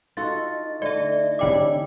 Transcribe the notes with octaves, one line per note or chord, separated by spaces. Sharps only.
D#4 F4 F#4 A4 D#5 A6
D3 A3 D5 E5
D3 E3 G3 D4 E4 G5 D6